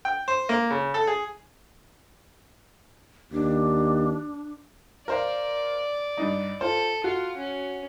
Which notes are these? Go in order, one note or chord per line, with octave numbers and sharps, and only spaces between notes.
G5
C5
A#3
C#3
A4
G#4
D#2 D4
A#4 C5 D5 F5
G2 D4 D#4
F4 A4 C5
F4 F#4
C#4